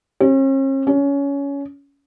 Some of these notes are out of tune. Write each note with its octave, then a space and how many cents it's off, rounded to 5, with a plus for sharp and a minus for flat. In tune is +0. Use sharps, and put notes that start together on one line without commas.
C#4 -45
C#4 +20